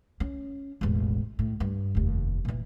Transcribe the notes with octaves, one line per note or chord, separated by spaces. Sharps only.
C#4
E1 A1
A2
G2
F1 D#2
A#2 E3